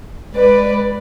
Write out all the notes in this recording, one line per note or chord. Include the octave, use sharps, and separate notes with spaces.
G#3 B4 D5